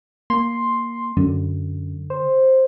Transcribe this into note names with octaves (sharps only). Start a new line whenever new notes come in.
A#3 C6
F#2 D3
C5